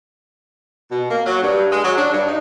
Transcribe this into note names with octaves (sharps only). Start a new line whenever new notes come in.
B2
A#3
F#3
G2
G#3
F#3
D4
G2
D#4